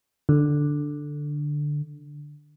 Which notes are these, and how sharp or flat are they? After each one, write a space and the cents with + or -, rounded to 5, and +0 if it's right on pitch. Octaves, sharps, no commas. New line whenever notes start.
D3 +5